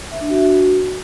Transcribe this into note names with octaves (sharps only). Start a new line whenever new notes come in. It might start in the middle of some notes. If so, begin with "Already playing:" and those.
E5
D4
F#4